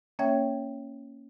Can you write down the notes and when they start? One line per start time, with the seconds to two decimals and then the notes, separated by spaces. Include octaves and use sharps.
0.19 A#3 C#4 C#5 E5 G5 G#6